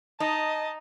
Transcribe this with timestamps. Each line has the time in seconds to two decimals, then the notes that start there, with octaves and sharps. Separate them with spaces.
0.20 D#4 D#5 A5